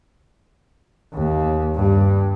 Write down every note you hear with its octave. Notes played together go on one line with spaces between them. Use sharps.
D#2
G2